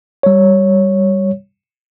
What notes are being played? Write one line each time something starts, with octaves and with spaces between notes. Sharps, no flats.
G3 C#5